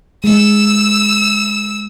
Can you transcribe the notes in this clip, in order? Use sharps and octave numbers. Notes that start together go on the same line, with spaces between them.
G#3 E6